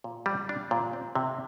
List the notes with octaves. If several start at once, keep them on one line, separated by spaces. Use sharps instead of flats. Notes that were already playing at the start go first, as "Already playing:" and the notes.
A#2
G3
D4
A#2
C4
C3